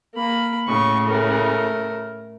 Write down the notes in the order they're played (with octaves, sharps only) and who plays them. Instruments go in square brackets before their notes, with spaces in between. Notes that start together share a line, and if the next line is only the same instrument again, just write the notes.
[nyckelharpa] A#3 B5
[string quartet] A2 C#3 [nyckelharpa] C#6
[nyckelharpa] A3 A#4